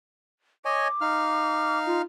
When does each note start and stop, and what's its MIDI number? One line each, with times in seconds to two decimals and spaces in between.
0.65 0.88 73
0.65 0.88 75
0.65 0.88 80
0.65 1.78 86
1.01 2.02 63
1.01 2.02 77
1.01 2.02 89
1.86 1.99 65